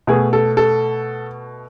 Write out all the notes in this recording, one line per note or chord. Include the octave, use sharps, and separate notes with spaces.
B2 A3 G#4
A4
A4